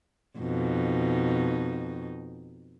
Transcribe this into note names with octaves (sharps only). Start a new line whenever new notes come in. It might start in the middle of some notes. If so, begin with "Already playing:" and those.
F2 B2 D#4